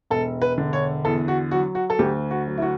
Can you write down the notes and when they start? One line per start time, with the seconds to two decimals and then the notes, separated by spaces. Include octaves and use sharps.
0.11 E1 A4
0.42 B4
0.58 D3
0.73 C#5
1.05 E2 A4
1.28 F#4
1.51 F#3 F#4
1.75 F#4
1.90 A4
1.99 D2 G4
2.31 F#4
2.47 F#3
2.58 E4
2.62 F#4